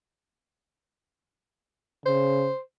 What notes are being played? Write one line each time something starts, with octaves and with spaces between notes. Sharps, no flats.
C#3 C5